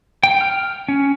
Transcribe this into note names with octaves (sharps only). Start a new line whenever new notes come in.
G5
F6
C#4